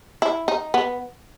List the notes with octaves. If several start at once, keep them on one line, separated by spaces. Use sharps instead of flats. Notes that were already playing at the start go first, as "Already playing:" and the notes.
E4
D#4
B3